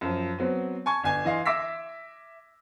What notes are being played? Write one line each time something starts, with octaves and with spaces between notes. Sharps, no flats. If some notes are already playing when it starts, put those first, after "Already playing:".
F#2 F3
F#3 B3 C4
G#5 A5 C#6 G#6
G1 G#5 G#6
E3 D#5 F5 C6
E5 D6 E6 A#6 B6